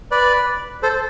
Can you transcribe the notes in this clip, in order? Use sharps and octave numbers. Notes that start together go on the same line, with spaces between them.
B4 D5
A4 C5